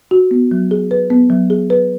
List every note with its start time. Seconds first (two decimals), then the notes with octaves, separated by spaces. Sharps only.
0.11 F#4
0.31 B3
0.51 F#3
0.71 G#4
0.91 B4
1.10 B3
1.30 F#3
1.50 G#4
1.70 B4